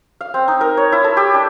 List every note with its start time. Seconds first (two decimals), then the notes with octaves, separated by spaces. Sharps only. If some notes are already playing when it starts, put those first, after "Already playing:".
0.21 F5
0.34 C4
0.48 D#4
0.61 A#4
0.77 C#5
0.92 E4
1.04 A4
1.17 G4
1.34 D4